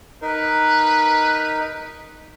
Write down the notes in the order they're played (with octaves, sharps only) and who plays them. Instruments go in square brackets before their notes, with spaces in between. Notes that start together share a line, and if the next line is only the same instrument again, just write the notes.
[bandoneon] D#4 A#4 [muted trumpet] B4